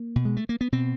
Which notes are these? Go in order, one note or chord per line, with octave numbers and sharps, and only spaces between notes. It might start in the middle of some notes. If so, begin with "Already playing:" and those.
Already playing: A#3
B2
G#3
A3
A#3
B3
B2 C4